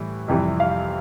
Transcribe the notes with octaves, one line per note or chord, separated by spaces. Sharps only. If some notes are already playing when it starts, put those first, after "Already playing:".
Already playing: A2 E3 G3
F2 C3 E3 G3
F5